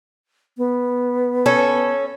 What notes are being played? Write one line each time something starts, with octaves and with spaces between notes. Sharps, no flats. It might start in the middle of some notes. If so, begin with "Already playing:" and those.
B3
C#4 A4